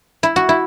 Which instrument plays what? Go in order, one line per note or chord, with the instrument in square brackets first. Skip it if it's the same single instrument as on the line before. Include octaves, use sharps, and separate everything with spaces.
[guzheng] E4
F#4
E4